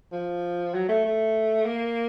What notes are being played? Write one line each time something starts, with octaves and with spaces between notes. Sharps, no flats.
F3
F#3
A3
A3
A#3